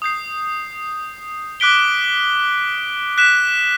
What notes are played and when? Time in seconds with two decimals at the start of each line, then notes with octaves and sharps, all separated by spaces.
0.02 D#6 G6 C7
1.60 D6 F#6 B6 D7 G7
3.18 F#6 B6 E7